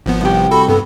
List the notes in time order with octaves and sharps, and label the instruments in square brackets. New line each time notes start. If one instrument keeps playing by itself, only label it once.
[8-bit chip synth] G#1 F3 B3
[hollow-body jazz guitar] C2 G4
[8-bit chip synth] F#4 A4 [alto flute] B5
[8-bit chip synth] G2 B3 [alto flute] A4